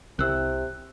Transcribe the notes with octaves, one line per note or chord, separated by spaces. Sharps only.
C2 C3 E6 F#6